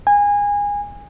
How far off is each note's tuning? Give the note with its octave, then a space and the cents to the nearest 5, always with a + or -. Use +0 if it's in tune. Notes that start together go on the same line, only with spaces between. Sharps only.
G#5 -25